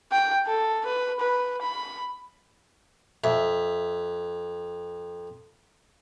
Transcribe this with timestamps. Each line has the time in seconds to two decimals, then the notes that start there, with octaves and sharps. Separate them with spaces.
0.12 G5
0.46 A4
0.85 B4
1.20 B4
1.62 B5
3.24 F2 E5